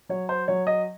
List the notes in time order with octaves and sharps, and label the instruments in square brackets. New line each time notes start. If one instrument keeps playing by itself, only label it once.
[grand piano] F#3 C#5
C5
F#3 C#5
D#5